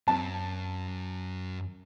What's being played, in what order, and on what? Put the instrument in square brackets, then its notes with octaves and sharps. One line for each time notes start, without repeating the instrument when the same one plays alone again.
[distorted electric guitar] F#2 [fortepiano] A5